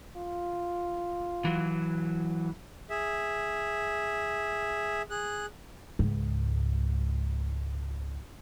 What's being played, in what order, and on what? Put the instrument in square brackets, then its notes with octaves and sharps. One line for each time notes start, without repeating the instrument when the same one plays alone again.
[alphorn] F4
[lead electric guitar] E3 F#3
[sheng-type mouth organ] G#4 E5
G#4 F#6
[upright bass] C#2 G#2